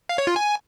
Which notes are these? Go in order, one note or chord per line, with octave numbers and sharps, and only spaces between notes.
F5
C#5
F4
G#5